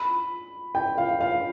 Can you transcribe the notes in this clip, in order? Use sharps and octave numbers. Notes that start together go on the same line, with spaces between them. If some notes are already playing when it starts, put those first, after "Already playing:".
Already playing: B5
G5
F5
F5